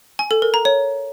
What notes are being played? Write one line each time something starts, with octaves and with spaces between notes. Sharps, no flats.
G#5
A4
A#4
A#5
C#5